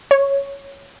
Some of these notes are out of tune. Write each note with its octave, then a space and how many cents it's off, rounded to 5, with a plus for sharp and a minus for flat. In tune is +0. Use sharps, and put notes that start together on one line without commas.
C#5 +0